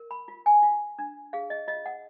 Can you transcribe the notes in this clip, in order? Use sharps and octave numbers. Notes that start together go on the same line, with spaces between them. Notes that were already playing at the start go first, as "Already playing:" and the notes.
Already playing: A#4
B5
F4
G#5
F4
D4
G#4 F5
D#5
F4 D#5
F#5